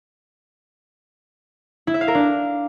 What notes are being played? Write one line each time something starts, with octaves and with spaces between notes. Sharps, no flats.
E4
E5
F5
A#4
D4